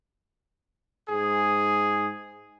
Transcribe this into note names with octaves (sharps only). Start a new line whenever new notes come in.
G#2 G#4